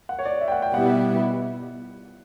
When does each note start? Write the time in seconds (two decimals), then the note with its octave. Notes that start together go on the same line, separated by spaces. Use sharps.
0.09 F#5
0.19 C#5
0.25 D5
0.41 E5
0.48 G5
0.52 F#5
0.62 G5
0.73 B2 G3 B3 E4 F#5